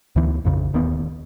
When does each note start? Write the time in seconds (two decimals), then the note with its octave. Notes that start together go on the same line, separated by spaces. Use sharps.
0.16 D2 E3 B3
0.45 A#1 F2 C#3
0.73 D1 D#2 B3